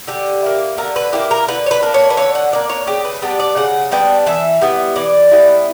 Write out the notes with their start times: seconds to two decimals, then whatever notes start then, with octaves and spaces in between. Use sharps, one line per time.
0.07 D3 G4
0.42 A#3 E4
0.78 D3 A#4
0.96 B4
1.12 A#3 E4 G4
1.31 A#4
1.48 D3 B4
1.66 C#5
1.71 B4
1.83 A#3 D4
1.94 C#5
2.10 B4
2.17 D3 C#5
2.35 F#5
2.52 A#3 D4 D5
2.69 C#5
2.87 C#3 G4
3.05 B4
3.22 G3 B3 D4 G4
3.40 D5
3.56 C#3 F#5
3.91 G3 B3 D4 G5
4.26 E3 E5
4.61 G3 B3 E4
4.96 E3 D5
5.31 G3 B3 E4